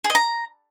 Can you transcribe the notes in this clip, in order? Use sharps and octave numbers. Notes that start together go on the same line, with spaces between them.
G#4
D#5
A#5